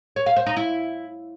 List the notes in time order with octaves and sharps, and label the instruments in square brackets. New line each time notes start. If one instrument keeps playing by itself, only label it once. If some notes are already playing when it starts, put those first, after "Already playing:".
[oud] C#5
F5
C5
D#4
E4